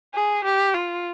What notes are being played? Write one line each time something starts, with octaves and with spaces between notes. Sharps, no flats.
G#4
G4
F4